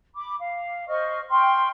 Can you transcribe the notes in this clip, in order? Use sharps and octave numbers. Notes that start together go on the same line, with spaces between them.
B5 D6
F5
C5 D#5 C#6 F6
G5 C6 C#6 F6